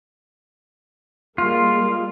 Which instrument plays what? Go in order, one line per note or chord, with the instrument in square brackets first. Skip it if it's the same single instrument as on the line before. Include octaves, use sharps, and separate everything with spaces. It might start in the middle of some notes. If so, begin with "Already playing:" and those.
[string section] G3 G#3 A#3 [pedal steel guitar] F4